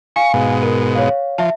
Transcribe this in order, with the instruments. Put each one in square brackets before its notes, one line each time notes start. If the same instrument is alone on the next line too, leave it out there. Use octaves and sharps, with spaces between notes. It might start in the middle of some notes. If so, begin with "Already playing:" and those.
[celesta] F5 G#5 [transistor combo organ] C#6
[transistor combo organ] G#2 B2
[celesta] A#4
C#5 F5
[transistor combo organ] F3 [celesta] E5 A5